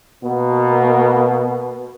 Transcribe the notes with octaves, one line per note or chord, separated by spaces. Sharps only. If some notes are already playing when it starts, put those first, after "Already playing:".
B2 A#3 B3